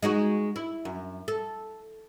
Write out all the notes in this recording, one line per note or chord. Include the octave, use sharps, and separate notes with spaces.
G#3 D#4 F#4
E4
F#2
A4